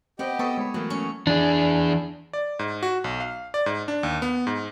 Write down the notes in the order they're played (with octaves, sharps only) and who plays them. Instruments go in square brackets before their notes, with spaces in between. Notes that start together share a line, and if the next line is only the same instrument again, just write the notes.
[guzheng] B3 [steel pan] C4 [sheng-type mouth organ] G4 D#5 G5
[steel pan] B3 [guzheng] A4 [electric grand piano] B5 C#6 D#6
[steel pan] G#3 [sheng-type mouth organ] C#5 [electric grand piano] B5 D#6
[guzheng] E3 [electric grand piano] F#3 A3 A#3
[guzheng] C#4
[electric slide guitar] E3 G#4 [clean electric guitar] D4
[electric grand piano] D5
G#2
F#4
B1
F5
D5
G#2
D4
D#2
B3
G#2